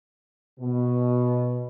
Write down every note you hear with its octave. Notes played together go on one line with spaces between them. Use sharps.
B2